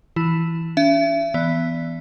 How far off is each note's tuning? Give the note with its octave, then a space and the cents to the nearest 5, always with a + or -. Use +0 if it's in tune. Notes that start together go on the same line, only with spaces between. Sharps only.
E3 +0 E4 +0
C#4 +45 E5 +35
E3 +0 B3 +0 D5 +10